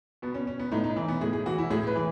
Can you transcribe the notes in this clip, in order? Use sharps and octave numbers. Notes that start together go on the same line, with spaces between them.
B2 B3
C#4
C#4
B3
A2 D#4
D#4
E3
B3
A2 G#4
G#4
E3 F#4
E4
A2 G#4
B4
E3